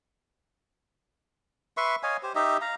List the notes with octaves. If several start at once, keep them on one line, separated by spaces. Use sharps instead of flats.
B4 E5 C6 C#6
C#5 D#5 F5 G#5
G4 C5
D#4 G4 D#5 E5
F5 A#5